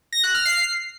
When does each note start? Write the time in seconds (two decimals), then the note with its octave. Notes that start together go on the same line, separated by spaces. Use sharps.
0.13 A#6
0.24 F#6
0.34 F6
0.45 C7